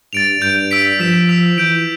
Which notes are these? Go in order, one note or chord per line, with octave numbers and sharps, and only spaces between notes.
G2 A6 D7 F7
G2 G6 D7 F7
E6 B6 D7
F3 E6 B6 E7
E6 B6 F7
E3 G6 D7 F7